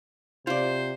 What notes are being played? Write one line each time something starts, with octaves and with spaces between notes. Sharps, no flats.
C3 F4 C5 D5